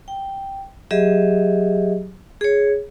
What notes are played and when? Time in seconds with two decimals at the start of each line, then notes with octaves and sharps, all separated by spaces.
0.08 G5
0.91 F#3 G4 G#4 D#5 E5
2.41 G#4 C#5